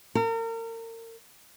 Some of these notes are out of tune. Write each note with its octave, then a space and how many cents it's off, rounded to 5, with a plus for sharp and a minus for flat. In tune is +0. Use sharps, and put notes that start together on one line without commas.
A#4 -35